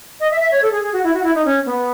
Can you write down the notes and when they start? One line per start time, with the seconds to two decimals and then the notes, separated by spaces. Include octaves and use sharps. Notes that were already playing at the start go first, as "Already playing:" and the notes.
0.20 D#5
0.31 E5
0.41 E5
0.52 C#5
0.62 A4
0.72 G#4
0.82 G#4
0.93 F#4
1.04 E4
1.14 F#4
1.24 E4
1.35 D#4
1.45 C#4
1.66 B3